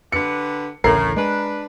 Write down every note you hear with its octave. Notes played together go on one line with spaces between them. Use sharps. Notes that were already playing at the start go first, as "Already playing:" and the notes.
D3 G4 B4 C#7
A1 D2 A2 C#3 A#4 C7
G#3 D4 B4